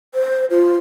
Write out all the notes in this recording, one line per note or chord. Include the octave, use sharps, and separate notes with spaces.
C5
F4